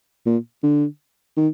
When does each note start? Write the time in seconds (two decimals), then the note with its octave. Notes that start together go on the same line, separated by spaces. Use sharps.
0.26 A#2
0.63 D3
1.37 D#3